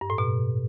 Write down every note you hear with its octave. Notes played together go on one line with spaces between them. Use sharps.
G2
A2
B2